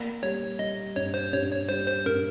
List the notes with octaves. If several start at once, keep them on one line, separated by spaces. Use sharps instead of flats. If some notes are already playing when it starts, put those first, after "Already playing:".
Already playing: A#3
G3 C#5
G3 D#5
G2 C#5
C5
G2 C#5
C#5
G3 C5
C5
G2 A#4